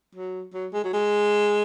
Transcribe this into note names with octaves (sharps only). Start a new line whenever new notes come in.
F#3
F#3
G#3
F#3
G#3